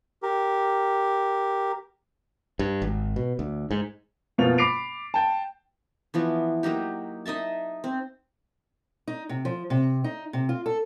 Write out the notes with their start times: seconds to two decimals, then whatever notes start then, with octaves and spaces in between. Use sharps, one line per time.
0.23 G4 A#4
2.59 G2
2.82 G#1
3.16 B2
3.39 D2
3.71 G#2
4.38 F#1 B2 F3 F4 F7
4.58 B5 D6 C7 D7 F7
5.14 G5 A5
6.14 E3 F3 B3
6.63 F#3 A#3 D#4 G4
7.26 D#4 D#5 E5 A5
7.84 C4
9.07 D#4
9.29 C3
9.45 F3
9.70 C3
10.04 D#4
10.33 C3
10.49 F4
10.66 A4